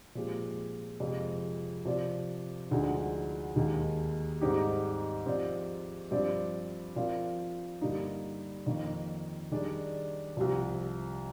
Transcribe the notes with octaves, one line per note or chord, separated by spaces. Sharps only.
A#2 F3 G#3 C4 G4
F2 C3 F3 G#3
C3 F3 C4 G4 D5
D2 D3 F3 G#3 D#4
D#2 D#3 G#3
G#2 G3 C4 D#4 G4
F3 C4 G4 D5
G2 F3 C4 G4 D5
F3 C4 F4 A#4 D5
G2 D3 G3 A#3 D#4
F2 D#3 A#3
D#3 G3 D4 G#4 D5
C2 C3 F3